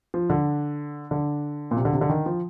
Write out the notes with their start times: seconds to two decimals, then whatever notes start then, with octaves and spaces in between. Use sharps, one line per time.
0.14 F3
0.30 D3
1.11 D3
1.71 A#2
1.77 C3
1.85 D3
1.93 C3
2.01 D3
2.09 D#3
2.26 F3